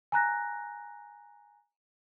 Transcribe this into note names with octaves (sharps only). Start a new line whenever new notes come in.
G#5 A#5 F#6 A#6